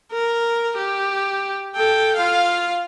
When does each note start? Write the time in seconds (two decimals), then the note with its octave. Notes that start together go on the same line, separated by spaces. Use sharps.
0.12 A#4
0.77 G4
1.76 A4 G5
2.16 F4 F5